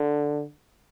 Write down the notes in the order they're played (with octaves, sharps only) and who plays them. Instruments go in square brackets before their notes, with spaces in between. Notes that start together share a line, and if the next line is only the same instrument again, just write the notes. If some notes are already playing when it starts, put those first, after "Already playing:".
Already playing: [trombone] D3